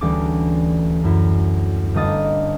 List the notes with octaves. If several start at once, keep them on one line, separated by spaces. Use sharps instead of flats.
D2 E3 G3 C#4 D6
F#2 E4
G1 G3 A#3 D#5 D#6 A6